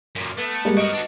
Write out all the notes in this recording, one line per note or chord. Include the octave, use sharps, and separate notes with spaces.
F#2 A#2
A3 B3
G3 G#3 A#3
F#4 A#4 D#5 D7
D4 F#4